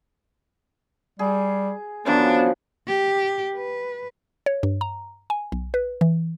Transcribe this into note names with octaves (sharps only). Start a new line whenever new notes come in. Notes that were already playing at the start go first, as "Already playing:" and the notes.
G3 G#4
F#2 E3 F3 B3 D4
G4
B4
C#5
G2
A#5
G#5
B1
B4
E3